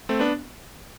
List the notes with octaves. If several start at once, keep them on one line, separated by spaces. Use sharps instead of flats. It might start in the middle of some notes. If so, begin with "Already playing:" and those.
A3 C4
B3 D4